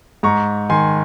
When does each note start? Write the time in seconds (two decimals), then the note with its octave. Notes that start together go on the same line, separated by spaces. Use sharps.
0.23 G#2 A#5 C#6
0.70 D#3 G#5 C6